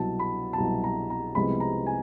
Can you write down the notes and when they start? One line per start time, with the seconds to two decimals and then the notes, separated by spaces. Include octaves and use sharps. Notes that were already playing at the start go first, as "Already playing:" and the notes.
Already playing: C2 B2 F#3 A5
0.19 B5
0.53 A5
0.58 C2 B2 F#3 A#5
0.84 A#5
1.10 A#5
1.35 C2 C3 F3 G#3 B3 B5
1.60 A#5
1.87 G#5